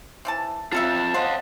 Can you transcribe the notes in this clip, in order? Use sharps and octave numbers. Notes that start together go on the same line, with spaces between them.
C3 E3 A5
C4 C#4 F4 A4 E5 A5
C5 D#5 F5 F#5